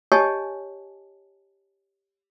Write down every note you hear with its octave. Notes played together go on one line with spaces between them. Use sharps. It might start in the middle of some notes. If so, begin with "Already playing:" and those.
G4 C#5 D#5 G#5 A5